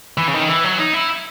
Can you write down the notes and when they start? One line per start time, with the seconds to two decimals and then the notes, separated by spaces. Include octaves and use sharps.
0.18 E3
0.28 C#3
0.34 D#3
0.48 E3
0.64 F#3
0.78 D#4
0.93 E4